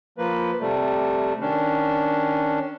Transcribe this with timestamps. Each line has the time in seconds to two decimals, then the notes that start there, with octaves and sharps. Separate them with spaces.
0.18 F3 A#3 B4
0.60 C3 G3 A3
1.41 D#3 C#4 D4